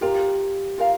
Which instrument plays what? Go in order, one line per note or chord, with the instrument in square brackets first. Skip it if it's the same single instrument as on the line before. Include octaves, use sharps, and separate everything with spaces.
[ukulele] F4 A#4 F5 A#5 [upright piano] G4
[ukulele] F4 A#4 F5 A#5